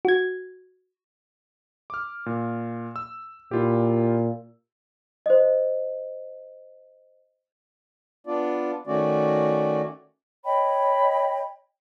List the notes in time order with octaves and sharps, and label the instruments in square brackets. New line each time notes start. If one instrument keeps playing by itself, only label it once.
[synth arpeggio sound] F#4 G#6
[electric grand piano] D6 F6
A#2
E6
[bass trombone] A#2 [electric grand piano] E4 F4 G4
[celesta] C5 D#5
[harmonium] B3 D4 F4 D5
D#3 A3 C#4 F#4 D5
[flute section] C#5 D#5 G5 B5